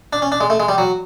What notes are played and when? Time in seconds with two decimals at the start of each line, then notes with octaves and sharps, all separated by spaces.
0.13 D4
0.22 C#4
0.32 D4
0.41 G#3
0.50 A3
0.60 G#3
0.69 G3
0.78 F#3